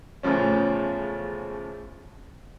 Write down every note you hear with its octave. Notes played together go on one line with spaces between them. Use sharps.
E2 A2 C#3 F3 C#4